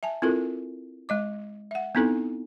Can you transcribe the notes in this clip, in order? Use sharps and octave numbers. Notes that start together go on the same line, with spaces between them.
E5 G#5 A5
C4 E4 F4 A4 A#4
G#3 D#5 D6
E5 F#5
B3 C4 D#4 E4 A4